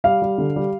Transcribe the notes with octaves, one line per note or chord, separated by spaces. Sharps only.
G3 F5
G3
D3
G3